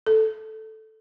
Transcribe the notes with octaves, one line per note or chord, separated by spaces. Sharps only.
A4